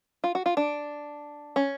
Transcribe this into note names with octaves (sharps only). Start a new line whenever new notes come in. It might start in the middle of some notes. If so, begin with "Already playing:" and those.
F4
F#4
F4
D4
C#4